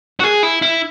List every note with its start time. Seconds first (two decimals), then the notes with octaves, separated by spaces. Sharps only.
0.20 F#4
0.24 G#4
0.43 E4
0.62 E4